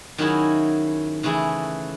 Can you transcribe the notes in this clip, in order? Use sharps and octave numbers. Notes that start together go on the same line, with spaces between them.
D#3 F#3 C#4 E4 G#4
C#3 E3 A3 E4 G#4